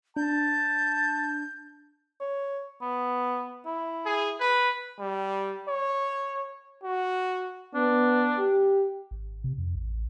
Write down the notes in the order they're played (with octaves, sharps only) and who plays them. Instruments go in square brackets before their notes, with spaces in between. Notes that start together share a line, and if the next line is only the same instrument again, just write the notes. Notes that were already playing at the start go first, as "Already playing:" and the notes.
[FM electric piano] D4 [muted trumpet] A5 [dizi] G6
[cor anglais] C#5
B3
E4
[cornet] G#4
B4
G3
C#5
F#4
[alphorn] B3 [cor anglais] D4
[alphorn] G4
[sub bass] G#1
C3
F2
A1